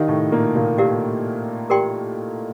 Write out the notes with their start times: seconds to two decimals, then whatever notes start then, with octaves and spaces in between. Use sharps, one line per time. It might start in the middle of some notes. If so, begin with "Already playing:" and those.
Already playing: D#3 D#4 E4 G4 A#4 D5 F5
0.08 A2 A3
0.31 A#2 A#3
0.55 A#2 A#3
0.78 E4 G4 A#4 D5 F5
1.70 G4 A#4 D5 G5 C6